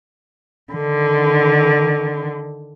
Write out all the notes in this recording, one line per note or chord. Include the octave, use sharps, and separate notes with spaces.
D3 D#3